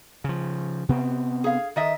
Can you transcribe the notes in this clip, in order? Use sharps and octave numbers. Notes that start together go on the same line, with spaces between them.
C#3 F3
C3 B3 C4
G#4 F5
D#3 D#5 E5